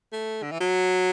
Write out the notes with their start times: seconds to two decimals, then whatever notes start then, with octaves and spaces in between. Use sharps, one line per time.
0.13 A3
0.43 D3
0.52 E3
0.61 F#3